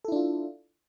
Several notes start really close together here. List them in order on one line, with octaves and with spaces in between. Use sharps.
A4 E4 D4 F4